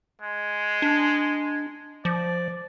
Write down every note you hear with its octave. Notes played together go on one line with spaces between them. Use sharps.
G#3
D4
F3 D5